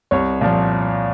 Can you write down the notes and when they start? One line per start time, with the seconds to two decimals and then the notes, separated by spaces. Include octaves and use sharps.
0.11 C2 C#5
0.41 A#2 F3